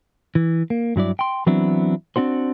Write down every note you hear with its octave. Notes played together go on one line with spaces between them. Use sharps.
E3
A#3
G2 F#3 E4 D5
G5 C6
E3 F#3 B3 C4 D4 E4
C4 D4 F#4 C5